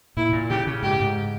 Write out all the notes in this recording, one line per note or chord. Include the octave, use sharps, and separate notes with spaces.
A#2 E4
A#2
C#3 G4
C#3
G#2 G4
G#2